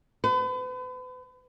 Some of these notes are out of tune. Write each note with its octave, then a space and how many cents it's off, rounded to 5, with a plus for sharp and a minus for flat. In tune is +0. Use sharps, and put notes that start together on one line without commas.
B4 +40